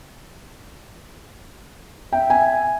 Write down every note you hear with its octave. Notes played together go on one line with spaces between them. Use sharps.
E5 G5
G#5